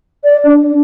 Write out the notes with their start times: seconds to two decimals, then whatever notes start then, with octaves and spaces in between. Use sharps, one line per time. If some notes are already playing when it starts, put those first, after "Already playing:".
0.24 D5
0.45 D4